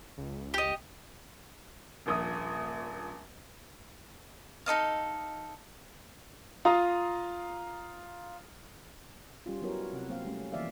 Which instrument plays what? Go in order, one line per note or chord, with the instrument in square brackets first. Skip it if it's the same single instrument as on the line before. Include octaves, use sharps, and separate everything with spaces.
[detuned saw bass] C#2
[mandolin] G4 D#5
[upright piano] D#1 A#1 D#6
[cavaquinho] D#4 A4 D#5 F5
[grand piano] F4 F5 A#5 D#6
[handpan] G3 C#4 F4
F#3 B3 E4 F#4 A#4 C#5
C3 F#5
F#3 A#3 C4 F5
G3 A3 C#4
E3 F3 A#3 D5 E5 F5